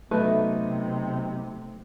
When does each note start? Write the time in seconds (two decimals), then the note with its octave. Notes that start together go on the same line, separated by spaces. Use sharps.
0.11 C3 F#3 A3 B3 D#4 B4 E5